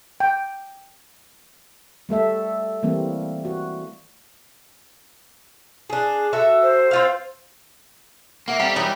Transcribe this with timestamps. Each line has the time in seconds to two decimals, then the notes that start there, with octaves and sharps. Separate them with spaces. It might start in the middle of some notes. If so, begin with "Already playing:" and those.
0.20 G5
2.09 G3 A3 A4 E5
2.83 E3 G3 A3 A#3 C4
3.45 F#4
5.90 D4 G#4
6.33 F#4 A4 E5
6.62 C5
6.91 C4 F4 F5
8.48 A#3 F#4 E5
8.60 G3 A3 A#3 C4 G4
8.76 E3 F#3 B3 D#4 A#4